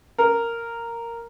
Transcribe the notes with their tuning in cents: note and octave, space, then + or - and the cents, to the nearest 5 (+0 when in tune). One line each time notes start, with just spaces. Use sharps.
A#4 -5